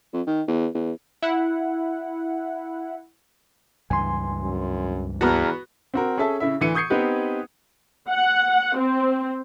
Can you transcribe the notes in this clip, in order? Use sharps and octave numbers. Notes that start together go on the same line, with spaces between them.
F2
D#3
E2
E2
E4 F#5
C#2 G2 E3 G#5 C6
F#2
E2 B3 F#4 A5 A#5 F6
C4 F#4 A#4
C#4 G#4 A4 E5 A5
C#3 E4 E5
D2 E3 C#7 D#7
C#6 D#6 G6 G#6 C7 C#7
B3 C4 D#4 G4 B4
F#5
C4